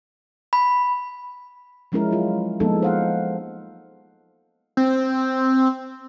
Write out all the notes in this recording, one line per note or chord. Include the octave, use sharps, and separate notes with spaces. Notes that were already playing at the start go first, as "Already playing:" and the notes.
B5
F3 G#3 C#4 E4 A#4
F#3 F4
F3 G#3 A#3 B3 D#4 A4
C5 F5 F#5
C4